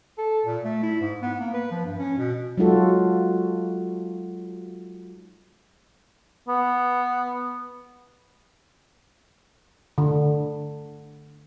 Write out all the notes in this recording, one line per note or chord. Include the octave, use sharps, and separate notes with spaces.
A4
A#2
A3
E4
G#2
B3
A#3
B4
F3
G2
C#4
B2
F#3 G#3 D#4 F4 F#4 A4
B3
D3